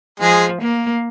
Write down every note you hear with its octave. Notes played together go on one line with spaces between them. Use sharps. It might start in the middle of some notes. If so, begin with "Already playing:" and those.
F3 G#3 G#4
A#3